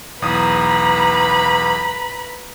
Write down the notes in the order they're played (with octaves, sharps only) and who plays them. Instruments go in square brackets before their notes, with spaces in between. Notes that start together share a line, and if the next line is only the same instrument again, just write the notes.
[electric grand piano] B1 E2 D#6 [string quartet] B4 A#5 B5